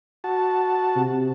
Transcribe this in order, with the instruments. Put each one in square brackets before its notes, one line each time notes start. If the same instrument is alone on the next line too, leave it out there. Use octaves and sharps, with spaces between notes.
[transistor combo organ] F#4 A5
[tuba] C3